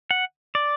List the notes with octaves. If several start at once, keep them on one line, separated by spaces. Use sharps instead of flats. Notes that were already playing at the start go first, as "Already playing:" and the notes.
F#5
D5